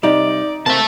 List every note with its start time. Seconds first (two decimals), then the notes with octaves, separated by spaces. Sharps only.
0.03 C3 G3 D#4 D5
0.66 C3 A#3 C4 E5 A5